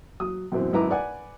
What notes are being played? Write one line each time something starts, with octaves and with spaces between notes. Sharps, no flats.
F#3 D#6
F#2 B2 E3 F#3 C4
G#1 F#2 E4 B4 A#5 D6
B4 D5 F#5 G#5